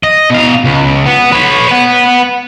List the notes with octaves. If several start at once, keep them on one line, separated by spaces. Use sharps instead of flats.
D#5
B2 F5
C#2
B3
B4 C#5
B4 F#5